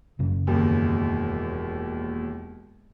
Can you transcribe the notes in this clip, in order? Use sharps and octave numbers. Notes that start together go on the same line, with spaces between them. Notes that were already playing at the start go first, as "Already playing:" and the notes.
F#2 C#3 F#3
E1 D#2